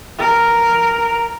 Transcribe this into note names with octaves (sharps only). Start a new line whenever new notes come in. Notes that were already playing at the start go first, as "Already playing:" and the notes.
A#4